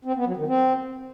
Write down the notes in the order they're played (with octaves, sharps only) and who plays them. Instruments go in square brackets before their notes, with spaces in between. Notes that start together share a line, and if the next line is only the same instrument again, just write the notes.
[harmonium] C4
B3
F#3
D#3
C4